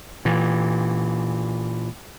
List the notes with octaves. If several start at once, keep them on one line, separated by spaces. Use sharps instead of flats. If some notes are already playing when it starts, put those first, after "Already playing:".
A#2 E3